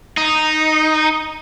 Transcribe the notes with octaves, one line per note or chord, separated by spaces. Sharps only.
D#4